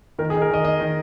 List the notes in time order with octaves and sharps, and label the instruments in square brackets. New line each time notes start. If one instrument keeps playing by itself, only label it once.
[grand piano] D#3 A#4
G#4
D#3
A#4
D#3 D#5
D#3 D#5
D#3